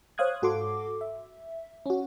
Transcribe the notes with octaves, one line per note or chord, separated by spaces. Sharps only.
C5 C#5 F5 D#6 F#6 G#6
G#2 F#4 A4 C6 D6
E5
C#4 F#4